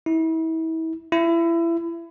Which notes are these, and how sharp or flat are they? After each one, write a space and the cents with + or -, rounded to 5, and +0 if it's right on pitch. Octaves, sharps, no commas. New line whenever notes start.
E4 -35
E4 +25